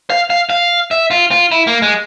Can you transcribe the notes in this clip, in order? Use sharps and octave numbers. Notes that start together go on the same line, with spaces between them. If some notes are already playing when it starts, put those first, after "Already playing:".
F5
F5
F5
E5
F4
F4
E4
A#3
G#3